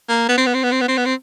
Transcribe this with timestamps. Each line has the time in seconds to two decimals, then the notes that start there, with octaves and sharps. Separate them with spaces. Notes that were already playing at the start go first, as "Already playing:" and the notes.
0.09 A#3
0.29 B3
0.37 C4
0.46 B3
0.54 C4
0.63 B3
0.72 C4
0.81 B3
0.88 C4
0.97 B3
1.05 C4